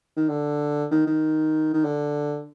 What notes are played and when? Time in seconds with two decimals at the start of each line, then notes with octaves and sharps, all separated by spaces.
0.17 D#3
0.29 D3
0.91 D#3
1.07 D#3
1.73 D#3
1.84 D3